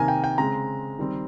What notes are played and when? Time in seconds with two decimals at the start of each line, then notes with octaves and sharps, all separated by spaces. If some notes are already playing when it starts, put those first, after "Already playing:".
Already playing: C3 D#3 A#3 G#5 A#5
0.08 G5
0.24 G5
0.38 C#3 G#3 C4 A#5
0.98 D#3 G3 C4